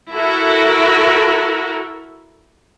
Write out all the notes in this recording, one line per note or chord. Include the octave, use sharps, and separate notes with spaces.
E4 F#4 A4 A#4